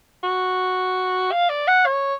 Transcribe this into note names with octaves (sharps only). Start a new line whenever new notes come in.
F#4
F5
D5
F#5
C#5